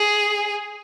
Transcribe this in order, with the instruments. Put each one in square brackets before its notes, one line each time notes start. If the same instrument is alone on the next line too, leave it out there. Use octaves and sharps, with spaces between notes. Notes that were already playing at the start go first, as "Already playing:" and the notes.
Already playing: [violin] G#4